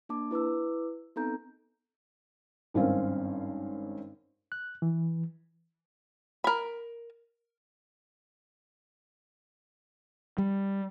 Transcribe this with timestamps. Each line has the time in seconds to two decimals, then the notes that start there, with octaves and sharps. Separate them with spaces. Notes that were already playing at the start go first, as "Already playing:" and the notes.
0.09 A#3 D4 A5 D6
0.31 E4 B4 D6 E6
1.16 B3 C4 D#4 A4 A#5 G6
2.74 G#1 G2 C4 C#4 A#4 F5
4.52 F#6
4.82 E3
6.44 A#4 B5
10.38 G3